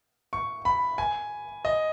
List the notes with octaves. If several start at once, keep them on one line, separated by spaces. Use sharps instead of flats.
C#6
B5
G#5
D#5